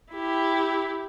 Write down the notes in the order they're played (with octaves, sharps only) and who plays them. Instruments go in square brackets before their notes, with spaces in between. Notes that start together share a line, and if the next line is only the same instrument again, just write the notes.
[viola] E4 G4